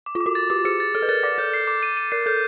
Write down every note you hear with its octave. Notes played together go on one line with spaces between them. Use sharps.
D6
F4
D6
F#4
A6
G4 D6
G#4 C#7
A6
A4 F6
B4
A#4 A6
D5 D6
A4 G6
C7
D6
D#7
D#7
A#4 C7
A4 G6